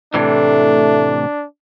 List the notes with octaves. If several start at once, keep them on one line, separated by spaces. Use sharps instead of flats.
A2 C3 E3 A3 D4